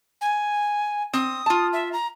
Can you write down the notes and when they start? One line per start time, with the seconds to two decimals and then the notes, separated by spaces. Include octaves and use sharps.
0.21 G#5
1.14 C4 D#6
1.46 F4 A5
1.73 E5
1.93 A#5